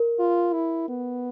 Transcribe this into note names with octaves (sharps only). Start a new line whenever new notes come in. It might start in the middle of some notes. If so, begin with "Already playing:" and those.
Already playing: A#4
F4
E4
B3